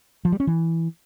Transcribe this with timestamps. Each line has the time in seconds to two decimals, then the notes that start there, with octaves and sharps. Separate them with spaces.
0.25 F3
0.32 G3
0.40 C#4
0.47 E3